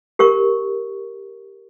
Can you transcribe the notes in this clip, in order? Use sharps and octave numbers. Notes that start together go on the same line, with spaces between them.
G4 A#4 C#6